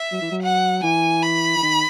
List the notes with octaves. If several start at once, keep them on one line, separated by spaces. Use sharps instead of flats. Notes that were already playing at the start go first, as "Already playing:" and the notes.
Already playing: E5
F#3
E3
F#3
F#5
E3 G#5
B5
E3
D#3